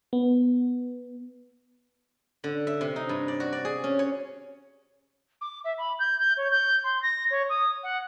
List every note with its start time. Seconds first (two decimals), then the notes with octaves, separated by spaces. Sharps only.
0.13 B3
2.44 D3
2.67 E5
2.81 C3
2.96 D#4
3.09 G2
3.28 D5
3.40 F#4
3.53 D5
3.65 G#4
3.84 C#4
3.99 C#5
5.41 D6
5.64 E5
5.78 B5
5.99 G6
6.19 G6
6.37 C#5
6.51 G6
6.84 C6
7.02 A#6
7.30 C#5
7.49 D#6
7.83 F#5